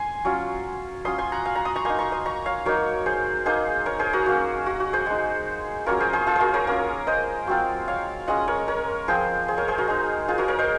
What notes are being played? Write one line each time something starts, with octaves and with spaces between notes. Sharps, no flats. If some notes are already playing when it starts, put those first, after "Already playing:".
Already playing: G#5 C6
F#3 C#4 F4
F#3 C#4 F4 C6 D#6
G#5 C6
F#5 A#5
F5 G#5
F#5 A#5
C6 D#6
A#5 C#6
A#3 D#4 G#5 C6
A#5 C#6
C6 D#6
A#5 C#6
C#5 F5
F#3 A#3 D#4 A#4 C#5
G#4 C5
A#3 D#4 G#4 C5
A#4 C#5
G#4 C5
F#4 A#4
F#3 A#3 C#4
F#4
F#4
G#4 C5
G#3 D#4
F#3 A#3 C#4 F4 A#4 C#5
G#4 C5
G#4 C5
F4 G#4
F#4 A#4 C5
A#4 C#5
A#3 C#4 F4 A#4 C#5
C5 D#5
F#3 C4 F4
C#5 F5
G#3 C#4 F4 D#5 F#5
A#4 C#5
A#4 C#5
F3 C4 F4 G#4 C5
G#4 C5
A#4 C#5
G#4 C5
F#4 A#4
G#3 D#4
F4 G#4
F#4 A#4
A#4 C#5
C5 D#5